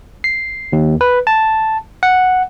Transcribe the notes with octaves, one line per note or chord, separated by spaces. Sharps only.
C7
D#2
B4
A5
F#5